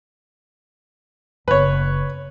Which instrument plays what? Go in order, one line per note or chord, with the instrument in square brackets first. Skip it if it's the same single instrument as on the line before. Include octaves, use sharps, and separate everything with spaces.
[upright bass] F#1 [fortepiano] B4 C#5